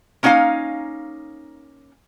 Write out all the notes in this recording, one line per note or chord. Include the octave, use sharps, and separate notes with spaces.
A#3 C#4 D#4 C#5 F5 G#5